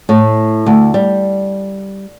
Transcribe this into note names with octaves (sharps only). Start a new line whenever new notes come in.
A2
D2
G3